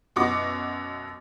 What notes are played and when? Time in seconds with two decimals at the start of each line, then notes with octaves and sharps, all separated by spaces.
0.16 F#2 B2 F#4 D6 A#6